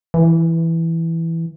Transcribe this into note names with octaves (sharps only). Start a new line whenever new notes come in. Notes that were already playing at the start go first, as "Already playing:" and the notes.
E3